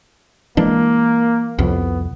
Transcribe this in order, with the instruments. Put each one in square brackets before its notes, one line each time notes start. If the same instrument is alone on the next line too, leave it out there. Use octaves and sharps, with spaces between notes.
[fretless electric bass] E3 G#3 D4 [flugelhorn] A#3
[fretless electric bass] C2 F2 [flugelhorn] B3